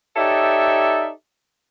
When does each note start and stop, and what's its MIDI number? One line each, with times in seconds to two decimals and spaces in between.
0.16 1.10 63
0.16 1.10 67
0.16 1.10 69
0.16 1.10 73
0.16 1.10 74
0.16 1.10 76